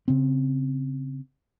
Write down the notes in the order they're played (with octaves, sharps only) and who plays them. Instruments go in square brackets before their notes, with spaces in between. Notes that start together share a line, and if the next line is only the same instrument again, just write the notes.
[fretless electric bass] C#3 C4